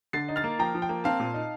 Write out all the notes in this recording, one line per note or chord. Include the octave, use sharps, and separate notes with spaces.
D3 A6 C7
D#4
F6 A6
A#3
F3 G5 A#5
F3
G5
A#3
C4 F5 A5
A#2
D#4